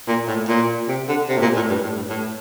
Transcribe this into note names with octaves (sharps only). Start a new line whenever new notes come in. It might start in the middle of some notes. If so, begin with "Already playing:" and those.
A#2
A2
A#2
C3
D3
C3
A2
A#2
A2
G2
A2
G2
A2